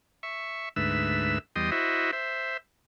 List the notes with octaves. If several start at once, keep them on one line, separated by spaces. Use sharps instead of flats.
E5 C#6
D2 G#2 B4 E5 E6
E2 G3 D#5 G5 C6 D#6
E4 F#4 C5 D#5 E5
C5 E5